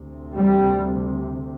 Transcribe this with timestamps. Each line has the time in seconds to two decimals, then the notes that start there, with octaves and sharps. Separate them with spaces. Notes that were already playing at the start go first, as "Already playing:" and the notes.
Already playing: D2 C3
0.35 G3